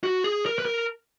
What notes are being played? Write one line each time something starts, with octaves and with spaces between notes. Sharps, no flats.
F#4
G#4
A#4
B4
A#4